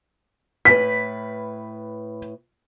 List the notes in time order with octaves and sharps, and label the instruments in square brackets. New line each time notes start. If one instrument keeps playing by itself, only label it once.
[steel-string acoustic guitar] A2 B4 [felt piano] B6